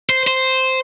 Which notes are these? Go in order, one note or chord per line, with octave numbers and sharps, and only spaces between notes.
C5
C5